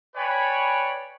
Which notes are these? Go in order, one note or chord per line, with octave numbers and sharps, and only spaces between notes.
B4 C#5 D5 G5 G#5 B5